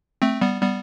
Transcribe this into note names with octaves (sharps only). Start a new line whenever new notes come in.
A3 C4
G3 B3
G3 B3